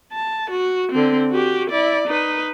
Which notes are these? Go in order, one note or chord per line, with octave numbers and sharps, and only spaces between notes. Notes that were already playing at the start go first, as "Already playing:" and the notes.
A5
F#4
D3 C4
F#4 G4
E4 D5
D#4 B4